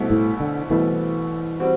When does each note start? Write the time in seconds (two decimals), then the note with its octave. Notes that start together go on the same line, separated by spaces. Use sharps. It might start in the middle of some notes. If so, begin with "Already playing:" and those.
Already playing: C2 B2 A3
0.10 A2
0.40 D3
0.69 C2 B2 E3 A3
1.60 G3 C4 F#4